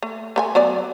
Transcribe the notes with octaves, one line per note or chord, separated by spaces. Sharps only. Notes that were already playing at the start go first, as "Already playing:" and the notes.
A3
A3 B4 G#5
F#3 B3 D5